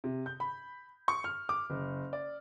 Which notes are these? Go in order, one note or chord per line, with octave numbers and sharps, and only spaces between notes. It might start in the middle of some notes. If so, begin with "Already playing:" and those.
C3
G6
B5
C#6
F6
D6
F#1
D5